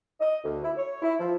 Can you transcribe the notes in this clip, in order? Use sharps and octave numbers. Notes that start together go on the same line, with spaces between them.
D#5
D2
E4
C#5
E4
F3